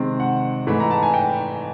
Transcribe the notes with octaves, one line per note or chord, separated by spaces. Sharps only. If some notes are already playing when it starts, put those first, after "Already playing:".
Already playing: C3 D#3 G#3 C4
F#5
G#2 E3 A3 B5
A#5
A5
G#5
G5